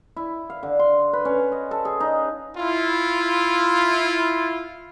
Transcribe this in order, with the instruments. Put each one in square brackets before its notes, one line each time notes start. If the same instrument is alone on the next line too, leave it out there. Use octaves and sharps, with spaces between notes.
[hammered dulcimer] E4
F5
D3
C6
B4
C#4
D#5
A4
G#4
D#4
[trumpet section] E4 F4